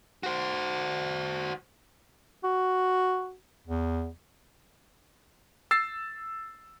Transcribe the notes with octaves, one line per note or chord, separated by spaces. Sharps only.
F#4 C5
F#4
E2
E6 A6 C7